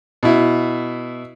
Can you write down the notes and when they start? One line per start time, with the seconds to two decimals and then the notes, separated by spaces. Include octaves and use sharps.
0.23 B2 E4